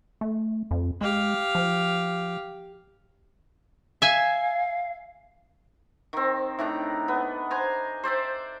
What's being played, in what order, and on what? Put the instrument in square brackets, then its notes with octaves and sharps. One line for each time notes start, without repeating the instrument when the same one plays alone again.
[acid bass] A3
F2
[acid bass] G#3 [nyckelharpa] G4 F5
[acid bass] F3
[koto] E5 G#5 [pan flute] F5
[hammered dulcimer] D#3 C4
A2 D#3 D4 A#5
B3
C5 G#5 A#5
C5 D5 E5 G5